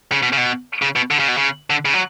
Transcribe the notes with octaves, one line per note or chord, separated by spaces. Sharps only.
C#3
B2
C#3
B2
C#3
B2
D3
C#3
B2
C#3
D3
C#3
F#3